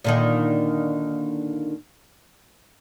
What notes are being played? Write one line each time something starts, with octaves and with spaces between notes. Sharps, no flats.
A#2 D3 D#3